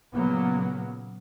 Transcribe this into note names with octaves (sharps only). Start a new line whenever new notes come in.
A#2 C#3 F#3 A#3 B3